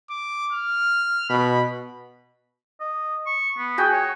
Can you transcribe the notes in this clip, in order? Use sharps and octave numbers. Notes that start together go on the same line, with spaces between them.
D6
F6
B2 B5
D#5
C#6
B3
F#4 G#4 G5
C#5